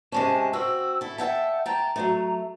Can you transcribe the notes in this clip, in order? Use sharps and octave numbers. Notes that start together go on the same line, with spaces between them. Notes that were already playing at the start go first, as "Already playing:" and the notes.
C3 G#3 C#4 A5
C4 F#4 E6
E4 A4
E5 F#5 G5 A5
G5 A5 A#5
F#3 G#3 A3